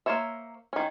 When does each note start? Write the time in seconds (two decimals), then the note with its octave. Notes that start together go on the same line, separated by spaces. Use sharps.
0.06 A#3 D#4 C5 C#5 E5
0.73 D#3 C#4